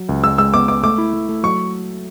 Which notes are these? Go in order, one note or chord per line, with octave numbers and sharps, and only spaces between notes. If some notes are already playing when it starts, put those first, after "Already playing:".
Already playing: F#3
C#2
G#3 E6
G#3 E6
B3 D6
B3 D6
A3 D6
E4
A3
A3
F#3 C#6